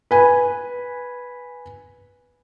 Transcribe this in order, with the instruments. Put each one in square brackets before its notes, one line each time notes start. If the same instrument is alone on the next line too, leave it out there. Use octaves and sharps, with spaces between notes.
[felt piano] B4 G#5